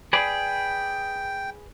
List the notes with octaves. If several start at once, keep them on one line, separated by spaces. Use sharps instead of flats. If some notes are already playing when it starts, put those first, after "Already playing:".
G#4 B4 D5 G5